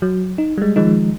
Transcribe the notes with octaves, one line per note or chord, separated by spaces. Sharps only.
F#3
D#4
G3 G#3
D#3 F3 G#3 D#4